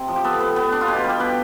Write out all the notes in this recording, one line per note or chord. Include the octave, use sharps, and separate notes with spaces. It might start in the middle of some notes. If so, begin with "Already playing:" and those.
Already playing: C3
F3
G4
B3 A4
B3
B3
D4
F4
B2 G4
G3 G4
G4
B2 B4